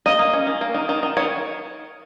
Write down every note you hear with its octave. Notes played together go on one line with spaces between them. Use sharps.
A#3 D#5
A#3
C#4
D#3
A#3
D#3
D#3
D#3
D#3 C#5